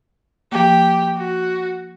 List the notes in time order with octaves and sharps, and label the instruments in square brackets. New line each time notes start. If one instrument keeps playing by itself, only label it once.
[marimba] F3 A#3 [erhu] G4
[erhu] F#4